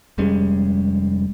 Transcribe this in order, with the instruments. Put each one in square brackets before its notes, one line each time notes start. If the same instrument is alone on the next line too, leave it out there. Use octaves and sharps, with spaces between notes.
[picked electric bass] F1 G3 G#3 C#4